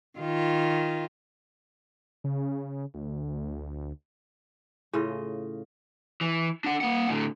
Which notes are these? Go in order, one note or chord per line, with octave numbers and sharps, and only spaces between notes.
D#3 F4
C#3
D2
A2 C#3 F4 D#5
E3
D4 F#5
A#3 F#5
A2 D3